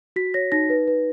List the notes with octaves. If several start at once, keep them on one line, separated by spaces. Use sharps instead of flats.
F#4 B6
C#5 A#6
D#4 A#6
B4
B4